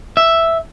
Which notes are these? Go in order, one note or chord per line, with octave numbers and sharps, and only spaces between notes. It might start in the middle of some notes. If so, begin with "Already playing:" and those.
E5